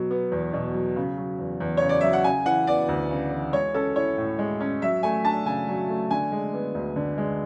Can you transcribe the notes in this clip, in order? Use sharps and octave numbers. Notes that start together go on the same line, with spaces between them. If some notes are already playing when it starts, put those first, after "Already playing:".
Already playing: B2 F#3
B3
E2
B2
F#3
C#3
F#3
E2
E2
C#3 C#5
D5
F#3 E5
F#5
C#3 G#5
E3 F#5
B3 D5
D2
C#3
E3
G#3 C#5
C#4 A4
E4 C#5
A2
G#3
C#4
F#3 E5
A3 G#5
D4 A5
C#3 G#5
F#3
A3
D3 G#5
G#3
B3
D2
D3
G#3